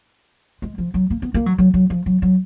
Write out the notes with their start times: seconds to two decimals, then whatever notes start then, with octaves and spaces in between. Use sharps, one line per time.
0.62 G#3
0.78 F3
0.94 F#3
1.10 A#3
1.22 B3
1.34 A#3
1.46 F#3
1.58 F#3
1.74 F#3
1.90 F3
2.06 F#3
2.22 F#3